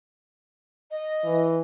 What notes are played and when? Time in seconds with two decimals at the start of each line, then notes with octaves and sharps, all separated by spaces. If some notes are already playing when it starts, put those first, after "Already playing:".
0.91 D#5
1.24 E3